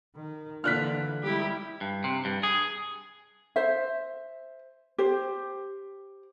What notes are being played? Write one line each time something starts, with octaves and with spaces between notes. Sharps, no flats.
D#3
A#2 D3 E3 D4 F6 F#6 B6
G3 G#3 E4 G4
G2
C3
G2
G#4
C5 E5
G4 C5